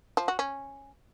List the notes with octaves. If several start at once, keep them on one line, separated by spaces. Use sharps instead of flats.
F3
F#4
C#4